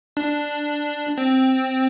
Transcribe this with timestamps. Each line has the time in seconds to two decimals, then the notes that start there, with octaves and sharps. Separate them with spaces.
0.17 D4
1.18 C4